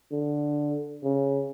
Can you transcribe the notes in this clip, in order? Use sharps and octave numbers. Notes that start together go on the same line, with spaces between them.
D3
C#3